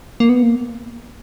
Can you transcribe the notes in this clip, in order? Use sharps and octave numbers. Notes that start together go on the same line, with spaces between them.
A#3
B3
A#3